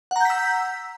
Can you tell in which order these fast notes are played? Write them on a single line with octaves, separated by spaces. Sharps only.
F#5 A#5 G6 B6 E6